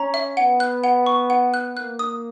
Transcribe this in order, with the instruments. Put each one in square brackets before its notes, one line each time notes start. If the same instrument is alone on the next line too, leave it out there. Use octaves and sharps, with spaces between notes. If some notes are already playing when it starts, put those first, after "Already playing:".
Already playing: [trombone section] C#4 [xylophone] A#5
[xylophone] E5
[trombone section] B3 [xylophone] F#5
[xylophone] F#6
F#5
C#6
F#5
F#6
[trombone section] A#3 [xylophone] F#6
[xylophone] D#6